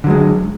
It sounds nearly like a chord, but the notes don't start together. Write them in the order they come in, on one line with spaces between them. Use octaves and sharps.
D3 F#3 G#3